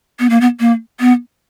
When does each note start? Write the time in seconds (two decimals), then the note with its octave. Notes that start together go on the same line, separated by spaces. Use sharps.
0.19 B3
0.30 A#3
0.41 B3
0.60 A#3
1.00 B3